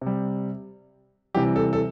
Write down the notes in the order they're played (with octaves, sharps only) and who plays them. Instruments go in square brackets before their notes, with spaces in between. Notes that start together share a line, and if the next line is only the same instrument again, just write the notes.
[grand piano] C3 G3
C3 E3 G3 G4
A4
A4